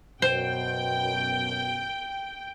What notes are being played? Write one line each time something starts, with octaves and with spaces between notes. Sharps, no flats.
F#2 B2 C5 G5